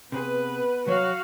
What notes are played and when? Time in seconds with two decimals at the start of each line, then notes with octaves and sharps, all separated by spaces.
0.12 C3 B3 G#4 B4
0.87 C2 F#3 F#4 C#5 F5